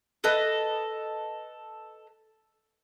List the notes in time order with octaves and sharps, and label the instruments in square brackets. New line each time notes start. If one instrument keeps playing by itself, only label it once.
[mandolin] A4 B4 D#5